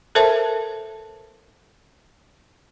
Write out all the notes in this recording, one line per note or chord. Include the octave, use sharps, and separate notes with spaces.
A4 A#4 C5 E5 A5